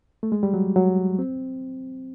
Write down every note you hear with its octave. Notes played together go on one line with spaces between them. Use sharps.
A3
G#3
G3
F#3
F#3
C4